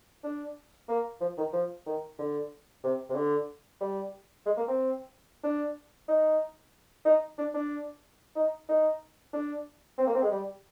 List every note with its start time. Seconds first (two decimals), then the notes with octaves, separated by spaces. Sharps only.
0.24 D4
0.89 A#3
1.21 F3
1.37 D#3
1.53 F3
1.86 D#3
2.18 D3
2.83 C3
3.10 C3
3.15 D3
3.81 G3
4.46 G#3
4.57 A#3
4.68 C4
5.43 D4
6.08 D#4
7.05 D#4
7.38 D4
7.54 D4
8.35 D#4
8.68 D#4
9.33 D4
9.98 C4
10.07 A#3
10.14 C4
10.22 G#3
10.31 G3